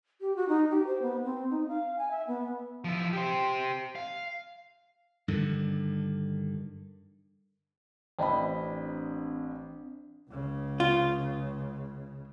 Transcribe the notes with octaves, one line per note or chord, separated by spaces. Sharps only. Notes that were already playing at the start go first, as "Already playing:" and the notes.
G4
F#4
D#4
G4
C5
B3
C4
D#4
F5
G#5
E5
B3
F3 E4
G4 C5
F5
G2 D3 D#3
A1 C4 D4 D#5 B5
C#2 C#3
F4